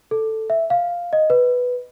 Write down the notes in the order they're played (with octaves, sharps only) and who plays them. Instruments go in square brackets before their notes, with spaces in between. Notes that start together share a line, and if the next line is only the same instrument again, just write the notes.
[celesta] A4
E5
F5
D#5
B4